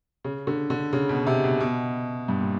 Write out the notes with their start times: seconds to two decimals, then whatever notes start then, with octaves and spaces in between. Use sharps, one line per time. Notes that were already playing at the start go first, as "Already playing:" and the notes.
0.24 C#3
0.47 D3
0.70 D3
0.93 C#3
1.09 B2
1.27 C3
1.44 B2
1.60 B2
2.28 G2
2.40 A#2